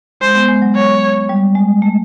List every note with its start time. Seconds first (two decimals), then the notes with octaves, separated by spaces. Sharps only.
0.21 G#3 C5
0.35 B3
0.48 G#3
0.62 F#3
0.75 F#3 C#5
1.29 G3
1.55 G#3
1.82 A3